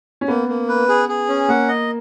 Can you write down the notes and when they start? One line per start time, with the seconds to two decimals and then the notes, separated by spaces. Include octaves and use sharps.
0.21 C#4
0.28 A#3 B3
0.48 A#3
0.69 B4
0.89 G#4
1.09 G#4
1.28 C#4
1.49 A#3 F#5
1.68 D#5